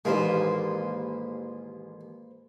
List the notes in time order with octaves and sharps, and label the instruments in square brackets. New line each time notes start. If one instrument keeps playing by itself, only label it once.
[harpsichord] A1 D#2 G#3 [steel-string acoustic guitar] A#3 B4 C5